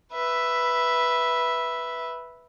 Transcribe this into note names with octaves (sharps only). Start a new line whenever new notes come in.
B4 E5